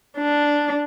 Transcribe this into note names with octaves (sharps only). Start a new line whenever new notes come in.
D4